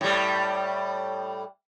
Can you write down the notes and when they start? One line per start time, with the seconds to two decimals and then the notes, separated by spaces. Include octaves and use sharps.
0.01 A2 G3